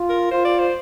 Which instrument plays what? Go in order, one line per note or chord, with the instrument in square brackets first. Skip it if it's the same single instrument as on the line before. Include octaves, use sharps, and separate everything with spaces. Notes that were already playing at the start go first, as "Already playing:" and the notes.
Already playing: [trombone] F4
[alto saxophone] A#4
[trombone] F4 [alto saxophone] C5
[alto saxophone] D5
C5